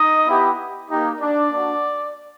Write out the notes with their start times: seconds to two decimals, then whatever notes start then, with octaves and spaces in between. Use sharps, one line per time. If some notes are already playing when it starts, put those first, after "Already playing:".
Already playing: D#4 D#5
0.28 B3 E4 G4
0.89 A#3 D#4 G4
1.20 D4 D5
1.51 A#3 D4 F#4